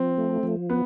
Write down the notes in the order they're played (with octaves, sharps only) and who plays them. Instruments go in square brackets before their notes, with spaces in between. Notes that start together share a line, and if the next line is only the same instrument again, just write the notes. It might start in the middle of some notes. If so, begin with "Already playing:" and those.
Already playing: [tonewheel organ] F3 [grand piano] C4
[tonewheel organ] A3
F3
[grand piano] B3